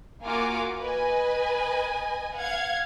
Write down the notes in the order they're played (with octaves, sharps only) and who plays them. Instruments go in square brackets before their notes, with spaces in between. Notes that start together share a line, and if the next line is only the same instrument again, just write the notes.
[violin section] A#3 F4 F#4 F5 G#5 D6
B4 D#5 G#5
F5 F#5 G#6